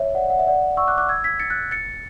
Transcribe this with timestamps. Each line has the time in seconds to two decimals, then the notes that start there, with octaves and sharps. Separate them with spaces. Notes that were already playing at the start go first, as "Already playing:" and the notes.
Already playing: C#5 E5
0.15 D5 F#5
0.30 F#5
0.39 E5
0.47 D5 F#5
0.77 C#6 E6
0.87 D6 F#6
0.98 D6 F#6
1.09 E6 G#6
1.24 G#6 B6
1.40 A6 C#7
1.50 F#6 A6
1.71 A6 C#7